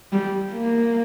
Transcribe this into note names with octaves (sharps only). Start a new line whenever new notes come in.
G3
A#3